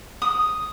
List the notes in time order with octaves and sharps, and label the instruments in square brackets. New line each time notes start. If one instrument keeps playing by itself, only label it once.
[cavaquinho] D#6